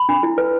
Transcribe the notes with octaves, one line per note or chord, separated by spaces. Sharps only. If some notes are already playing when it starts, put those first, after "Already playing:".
Already playing: B5
D4
E4
B4